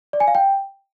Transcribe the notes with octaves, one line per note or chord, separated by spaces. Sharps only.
D5
G#5
F5
G5